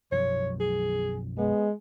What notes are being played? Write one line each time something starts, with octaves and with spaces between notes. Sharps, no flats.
B1 F#2 F3 C#5
G#4
G#3 B3